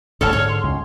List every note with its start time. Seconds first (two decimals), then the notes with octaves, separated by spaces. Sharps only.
0.21 D1 A1 G2 A4 C#5 A5 F6
0.33 G#2 D3 C#5
0.49 C6
0.64 C#2